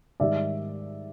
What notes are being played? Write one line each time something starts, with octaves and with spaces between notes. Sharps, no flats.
G#2 D#3 G3 D5 E5